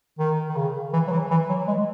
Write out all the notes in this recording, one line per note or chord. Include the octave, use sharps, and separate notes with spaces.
D#3
D#3
C#3
E3
F#3
E3
E3
F#3
G#3